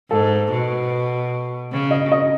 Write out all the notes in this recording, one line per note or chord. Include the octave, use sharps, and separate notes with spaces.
G#2 A4
B2
C#3
D#5
D#5